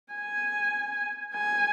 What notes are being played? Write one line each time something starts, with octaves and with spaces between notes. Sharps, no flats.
G#5
G#5